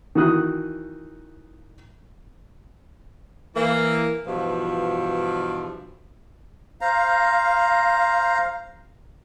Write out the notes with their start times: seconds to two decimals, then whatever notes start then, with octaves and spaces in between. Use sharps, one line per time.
0.15 D#3 E3 F#4 D#6 F#6
3.55 E3 A#3
4.26 G2 B2 E3 F3
6.81 C5 F5 A#5